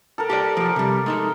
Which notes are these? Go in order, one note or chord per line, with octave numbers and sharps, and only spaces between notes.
A4 A#4
G4 C5 D5
F3 G4
C3 G3
G#3 D#4 A4